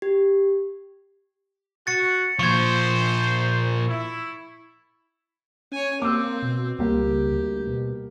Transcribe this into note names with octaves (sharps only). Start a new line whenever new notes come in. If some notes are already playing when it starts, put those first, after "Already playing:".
G4
F#4 A6 C#7
A#2 F3 C5 C#6 G#6
E4
C#4 C#5 G#5
A#3 C4 D6 E6
B2
C#2 G3 A#3 G4
D2
B2